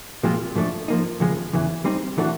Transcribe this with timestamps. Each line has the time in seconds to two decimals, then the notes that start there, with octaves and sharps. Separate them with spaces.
0.23 A#2 F3 G#3 C4 F4
0.55 G#2 F3 A3 D4
0.88 F3 A#3 D#4
1.20 F2 C#3 F3 G#3
1.53 E2 C#3 E3
1.85 G3 C4 D#4
2.18 E3 A3 D4 F#4